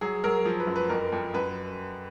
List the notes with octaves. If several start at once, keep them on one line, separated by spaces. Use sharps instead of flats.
F#3 G#4
F#3 A#4
F3
B4
F#2
B4
F2 A#4
F2
F#2 B4